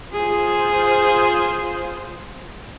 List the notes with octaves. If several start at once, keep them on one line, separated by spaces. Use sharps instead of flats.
F4 G#4 C5